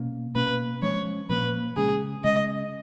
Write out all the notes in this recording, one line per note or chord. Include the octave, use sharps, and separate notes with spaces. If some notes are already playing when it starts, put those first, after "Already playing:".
Already playing: B2 A#3 C#4
B2 A#3 C#4 B4
F3 G#3 C#4 C#5
A#2 F3 A#3 B4
C#3 G#3 C#4 G#4
C#3 G#3 C#4 D#5